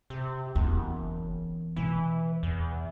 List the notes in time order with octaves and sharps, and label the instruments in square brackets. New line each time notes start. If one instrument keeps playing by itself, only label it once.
[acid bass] C3
[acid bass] F#1 [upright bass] E2
[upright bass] B2 [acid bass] E3
[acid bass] E2